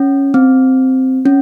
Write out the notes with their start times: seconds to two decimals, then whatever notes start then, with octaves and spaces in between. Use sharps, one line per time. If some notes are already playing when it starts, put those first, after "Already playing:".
Already playing: C#4
0.34 C4
1.26 C#4